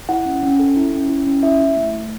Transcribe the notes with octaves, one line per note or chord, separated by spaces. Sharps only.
E4 F#5
C#4
C#4
A4
E4
C#4
E4
C#4
E4 E5
E4
A3
A3